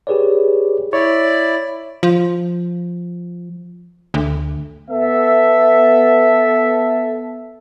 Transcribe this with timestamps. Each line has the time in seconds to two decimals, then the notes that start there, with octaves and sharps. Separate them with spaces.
0.07 G4 G#4 B4 C#5 D5
0.93 E4 C#5 D5
2.03 F3
4.14 D2
4.90 B3 A4 E5